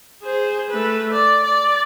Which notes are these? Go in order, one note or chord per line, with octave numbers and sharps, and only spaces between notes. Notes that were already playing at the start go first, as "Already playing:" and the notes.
G#4 C5
A3 B4
D5
D5